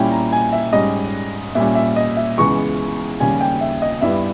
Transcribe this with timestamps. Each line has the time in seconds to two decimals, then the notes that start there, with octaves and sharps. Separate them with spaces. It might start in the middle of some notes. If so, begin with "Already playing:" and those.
Already playing: A#2 G3 C#4 E4 G5
0.11 A#5
0.32 G#5
0.52 E5
0.73 G#2 G3 C#4 D#5
1.55 A#2 G3 C#4 E5
1.75 E5
1.96 D#5
2.17 E5
2.38 C#2 C#3 E3 G#3 B3 C#6
3.20 D#2 C#3 G3 C#4 G#5
3.41 G5
3.61 E5
3.82 D#5
4.01 G2 G3 B3 E4 E5